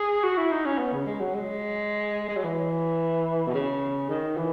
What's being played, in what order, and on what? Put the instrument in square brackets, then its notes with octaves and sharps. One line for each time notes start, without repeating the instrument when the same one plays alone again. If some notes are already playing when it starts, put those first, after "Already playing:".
Already playing: [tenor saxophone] G#4
F#4
E4
D#4
C#4
B3
C#3
G#3
F#3
G#3
G#3
F#3
E3
B2
C#3
D#3
E3